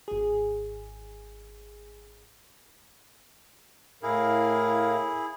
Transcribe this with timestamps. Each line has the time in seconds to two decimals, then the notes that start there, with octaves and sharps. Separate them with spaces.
0.08 G#1 G#4
4.03 A2 E4 G#4 A#4 F5